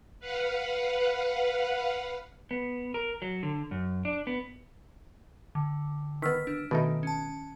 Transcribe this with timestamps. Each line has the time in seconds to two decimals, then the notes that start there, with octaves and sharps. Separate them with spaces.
0.20 B4 F5 F#5
2.51 B3
2.94 A#4
3.22 F#3
3.43 D3
3.71 F#2
4.05 D4
4.27 B3
5.55 D3
6.22 D#3 B3 E6 F6 B6
6.47 D4
6.71 B2 D#3 A3 D#4
7.03 C#4 A5